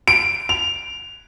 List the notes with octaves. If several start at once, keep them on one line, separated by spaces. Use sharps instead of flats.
D7
F7